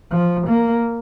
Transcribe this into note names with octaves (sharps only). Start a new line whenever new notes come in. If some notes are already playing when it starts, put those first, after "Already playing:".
F3
A#3